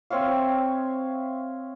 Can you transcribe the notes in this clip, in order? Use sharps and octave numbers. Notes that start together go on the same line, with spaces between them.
C4 C#5 E5 F5